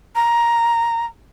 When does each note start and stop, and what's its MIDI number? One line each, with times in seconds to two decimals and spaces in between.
0.15 1.06 82